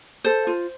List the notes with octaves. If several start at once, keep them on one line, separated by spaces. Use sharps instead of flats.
A4 C5
F4